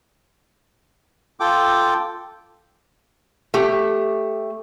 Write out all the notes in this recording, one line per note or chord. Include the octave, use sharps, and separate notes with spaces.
F4 A4 G5 D6
A3 G4